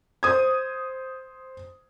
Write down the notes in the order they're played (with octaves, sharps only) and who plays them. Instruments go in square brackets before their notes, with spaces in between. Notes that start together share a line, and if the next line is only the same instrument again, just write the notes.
[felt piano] C5 D#6 G#6